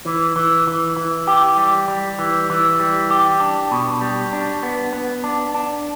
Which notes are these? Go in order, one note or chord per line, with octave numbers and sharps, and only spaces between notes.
E3
E3
E3
E3
G4
G3
G3
E3
E3
G3
G4
D4
B2
G3
D4
B3
B3
D4
D4